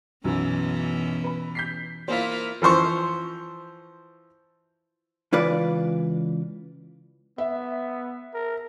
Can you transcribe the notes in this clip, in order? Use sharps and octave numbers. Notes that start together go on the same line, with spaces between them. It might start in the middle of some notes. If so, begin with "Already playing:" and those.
B1 F#2 B2 E3 F#3 C#4
B4 B5
G6 B6 C7
A#3 E4 F4 C5 F5 B6
E3 F3 C5 C#6
C#2 E3 F4 B4 D5
B3 E5
A#4